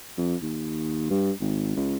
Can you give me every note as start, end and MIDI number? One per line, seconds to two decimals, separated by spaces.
0.18 0.36 41
0.42 1.06 39
1.10 1.32 43
1.41 1.75 32
1.76 1.97 37